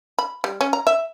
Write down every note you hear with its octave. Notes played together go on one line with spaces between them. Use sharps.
B5
G3
C#4
A#5
E5